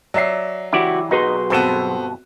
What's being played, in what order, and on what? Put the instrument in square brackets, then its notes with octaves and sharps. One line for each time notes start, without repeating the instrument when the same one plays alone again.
[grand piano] F#3 [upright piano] D5 E5 C7
[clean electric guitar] C#2 F#4 G5 [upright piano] E3 [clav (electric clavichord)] E4 G4 D5
[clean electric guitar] B1 G#4 C6 [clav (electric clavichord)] D#4 [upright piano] F#4 B4
[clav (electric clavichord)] G1 B2 A4 [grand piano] B3 C4